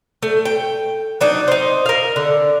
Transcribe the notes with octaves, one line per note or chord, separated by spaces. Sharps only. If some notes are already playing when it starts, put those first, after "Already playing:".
A3
G5
F#3 D4 D#4
D#4 C5
A#4 F5
D3